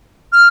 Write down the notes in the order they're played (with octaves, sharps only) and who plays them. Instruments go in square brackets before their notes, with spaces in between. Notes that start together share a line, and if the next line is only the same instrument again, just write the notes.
[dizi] F6